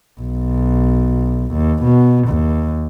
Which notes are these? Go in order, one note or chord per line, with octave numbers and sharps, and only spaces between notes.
B1
D#2
B2
D#2